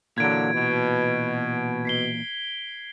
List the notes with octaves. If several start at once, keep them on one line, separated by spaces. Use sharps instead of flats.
A#2 D3 E3 F#3 A#3 G#6 D7
B2
B6 C7 G7